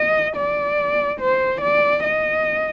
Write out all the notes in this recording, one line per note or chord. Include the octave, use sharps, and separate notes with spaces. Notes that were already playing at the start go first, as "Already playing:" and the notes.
Already playing: D#5
D5
C5
D5
D#5